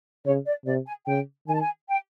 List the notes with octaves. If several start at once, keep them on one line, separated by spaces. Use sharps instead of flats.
C#3 C#5
D5
C3 D5
G#5
C#3 G5
D#3 G#5
A5
G#5
G5